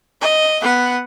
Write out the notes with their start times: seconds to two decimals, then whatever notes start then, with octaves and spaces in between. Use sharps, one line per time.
0.21 D#5
0.62 B3 F#5